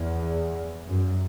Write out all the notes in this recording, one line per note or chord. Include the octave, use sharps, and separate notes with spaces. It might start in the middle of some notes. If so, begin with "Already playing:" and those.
Already playing: E2
F#2